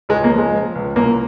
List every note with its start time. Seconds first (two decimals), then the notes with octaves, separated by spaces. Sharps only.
0.09 C#2 G#3
0.24 A#3
0.31 F3
0.38 G#3
0.53 F3
0.75 C#2
0.96 C2 A#3